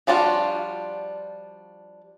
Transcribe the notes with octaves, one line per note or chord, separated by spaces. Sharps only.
F3 G3 D4 F4 F#4